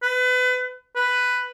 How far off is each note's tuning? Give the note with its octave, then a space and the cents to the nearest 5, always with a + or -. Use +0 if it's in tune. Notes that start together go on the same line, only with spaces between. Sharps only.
B4 +30
B4 +5